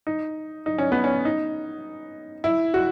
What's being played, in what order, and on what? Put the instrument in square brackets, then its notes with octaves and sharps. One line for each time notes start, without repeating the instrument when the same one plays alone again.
[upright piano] D#4
D#4
C#4
B3
C#4
D#4
E4
F#4